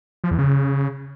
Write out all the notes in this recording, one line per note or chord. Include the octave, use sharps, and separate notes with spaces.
F3
E2
C#3